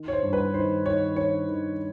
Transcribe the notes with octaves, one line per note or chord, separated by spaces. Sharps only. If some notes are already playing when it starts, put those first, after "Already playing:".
Already playing: D#3
C#5
C5
G2
B4
D#3 C5
D#3 C#5
D#3 C#5
D#3